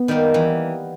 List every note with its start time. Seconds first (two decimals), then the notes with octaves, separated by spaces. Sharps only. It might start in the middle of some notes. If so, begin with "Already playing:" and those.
Already playing: B3
0.08 D#3 G3 A#3
0.34 E3